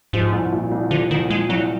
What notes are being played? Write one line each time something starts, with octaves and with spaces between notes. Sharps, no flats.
G#2 F3
C2
A#2
C2
D3 F3
C2 D#3
A#2 G#3
C2 F#3